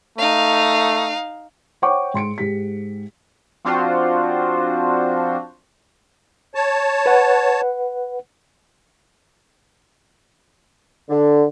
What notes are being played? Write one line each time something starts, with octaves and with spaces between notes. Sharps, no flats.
A3 D#4 F5
C5 C#5 F#5 G5 C#6 D6
G#2 C6 C#7 D7
G#2 G4 B6
F3 C4 D4 F4 F#4 C5
C#5 A5
B4 F#5
D3